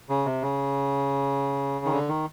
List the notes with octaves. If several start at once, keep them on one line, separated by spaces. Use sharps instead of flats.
C#3
C3
C#3
D#3
D3
D#3